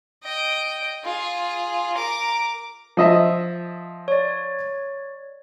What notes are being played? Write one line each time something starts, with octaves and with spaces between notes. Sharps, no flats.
D#5 G5
F4 G#4
A#4 D6
F3 D#5 E5
C#5 D5